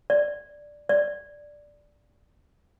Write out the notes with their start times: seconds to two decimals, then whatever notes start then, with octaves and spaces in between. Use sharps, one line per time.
0.10 D5
0.89 D5